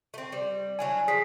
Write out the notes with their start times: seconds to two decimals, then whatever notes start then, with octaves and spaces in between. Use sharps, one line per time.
0.14 A3 C4
0.32 G3
0.79 F#3 D4 E4 G#5
1.08 F3 G#4 B6 C7